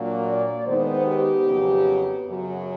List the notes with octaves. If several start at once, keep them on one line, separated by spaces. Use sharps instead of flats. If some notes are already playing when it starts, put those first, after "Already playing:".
Already playing: A#2 F#3 A#3 D4
D5
D#3 G#3 B3 D#4 C5
G4
F2 C#3 F#3 B3
F#2 C#3 F#3 F#4